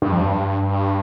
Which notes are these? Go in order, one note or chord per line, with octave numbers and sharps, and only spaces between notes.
G2
F2
G2